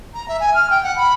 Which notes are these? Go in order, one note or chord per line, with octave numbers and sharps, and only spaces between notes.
A#5
E5
G#5
F6
G5
F#5
B5